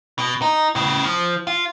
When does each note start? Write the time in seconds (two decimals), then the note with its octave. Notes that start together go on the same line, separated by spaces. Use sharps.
0.18 B2
0.42 D#4
0.75 A2 C#3
1.05 F3
1.47 F4